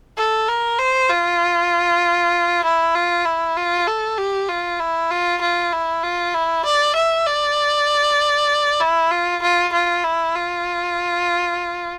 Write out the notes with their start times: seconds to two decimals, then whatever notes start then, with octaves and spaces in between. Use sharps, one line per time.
0.17 A4
0.48 A#4
0.79 C5
1.10 F4
2.64 E4
2.95 F4
3.25 E4
3.57 F4
3.87 A4
4.18 G4
4.49 F4
4.80 E4
5.11 F4
5.41 F4
5.73 E4
6.03 F4
6.34 E4
6.65 D5
6.95 E5
7.27 D5
8.80 E4
9.11 F4
9.42 F4
9.73 F4
10.04 E4
10.35 F4